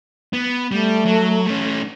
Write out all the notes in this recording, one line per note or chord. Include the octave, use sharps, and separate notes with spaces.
B3
G3 A3
F#3
A3 C#4